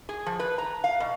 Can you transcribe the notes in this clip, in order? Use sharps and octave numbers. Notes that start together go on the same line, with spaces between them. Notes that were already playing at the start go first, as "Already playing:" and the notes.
G#4
F3
B4
A#5
F5
B2